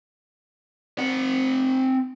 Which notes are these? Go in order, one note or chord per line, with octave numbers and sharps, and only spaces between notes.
C4 F#5